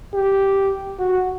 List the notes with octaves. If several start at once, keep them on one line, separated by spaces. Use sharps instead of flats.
G4
F#4